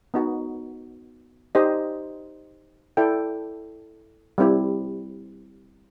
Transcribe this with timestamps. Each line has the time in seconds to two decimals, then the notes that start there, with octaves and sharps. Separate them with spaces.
0.14 B3 D#4 F#4
1.55 D#4 G4 C5 D#5
2.97 E4 A4 D5 G5
4.38 G3 C4 E4 G4